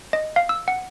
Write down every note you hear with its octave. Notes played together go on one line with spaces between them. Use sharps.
D#5
F5
E6
F#5